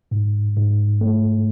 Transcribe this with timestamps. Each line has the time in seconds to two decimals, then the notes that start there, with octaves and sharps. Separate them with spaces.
0.11 G#2
0.56 G#2
1.01 A3